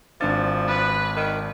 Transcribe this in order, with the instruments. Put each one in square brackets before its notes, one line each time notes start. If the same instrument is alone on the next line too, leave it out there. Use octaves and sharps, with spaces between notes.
[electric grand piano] G#1 D4 A6 [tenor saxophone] F3
[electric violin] B4 F#6
[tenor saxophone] D#3